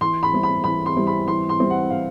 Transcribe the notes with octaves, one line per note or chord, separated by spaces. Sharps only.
E3 C6
B5
G3 C4 E4
B5
E3 B5
C6
G3 C4 E4
B5
E3 C6
C6
G3 C4 E4
F#5
E3 F5